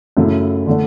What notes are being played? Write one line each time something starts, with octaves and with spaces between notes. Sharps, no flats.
F#2 C#3 F#3 A3 E4
D3 A3 D4